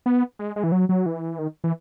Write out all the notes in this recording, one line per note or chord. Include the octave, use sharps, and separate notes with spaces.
B3
G#3
G#3
E3
F#3
F#3
E3
D#3
E3